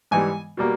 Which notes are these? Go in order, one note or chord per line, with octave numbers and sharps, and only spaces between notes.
G#2 E3 G3 G#5
B2 G3 A#3